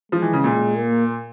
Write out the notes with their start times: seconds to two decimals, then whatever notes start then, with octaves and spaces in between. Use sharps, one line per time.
0.12 F3 G#3
0.22 E3
0.33 C#3
0.44 A#2
0.77 A#3